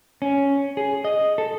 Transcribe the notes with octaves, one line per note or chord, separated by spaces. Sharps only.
C#4
G#4
D#5
A4